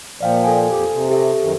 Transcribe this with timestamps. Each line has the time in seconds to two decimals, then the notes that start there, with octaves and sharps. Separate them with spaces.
0.21 A#2 F3 D5 F5 G5
0.44 A4 G#5
0.70 F2 G4
0.92 C3
1.10 G4 A4 E5
1.42 F#2 D#3